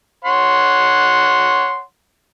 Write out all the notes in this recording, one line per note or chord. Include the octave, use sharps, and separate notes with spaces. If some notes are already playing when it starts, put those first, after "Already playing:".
C#5 F#5 C6